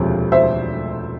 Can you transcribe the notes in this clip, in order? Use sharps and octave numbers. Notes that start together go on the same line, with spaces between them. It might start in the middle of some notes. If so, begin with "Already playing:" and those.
Already playing: E1 D2 C3 F3
C5 E5